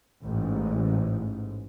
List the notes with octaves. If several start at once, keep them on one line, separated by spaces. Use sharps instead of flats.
A1 G#2